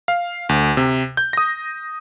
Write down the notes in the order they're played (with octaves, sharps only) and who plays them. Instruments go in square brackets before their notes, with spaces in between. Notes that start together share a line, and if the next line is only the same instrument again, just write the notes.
[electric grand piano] F5
D2
C3
G6
D#6 A#6